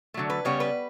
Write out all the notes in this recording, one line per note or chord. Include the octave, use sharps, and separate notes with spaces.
D3 F#3 A3
B4
C#3 G3 B3 C#5
B4